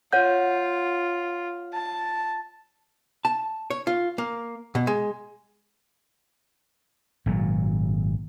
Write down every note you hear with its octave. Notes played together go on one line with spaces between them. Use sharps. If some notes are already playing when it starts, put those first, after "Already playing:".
F4 C#5 F#5 G6
A5
A5
C#5
F4
A#3
B2
G#3
G#1 G2 A#2 F#3